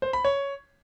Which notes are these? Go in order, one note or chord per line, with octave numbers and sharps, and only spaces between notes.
C5
B5
C#5